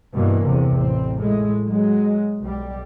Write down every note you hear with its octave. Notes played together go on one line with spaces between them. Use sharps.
G2 B2 E3 A#3
G1 E2 C3
A1 C4
A2 G#3
F#3 G#3
B1 G3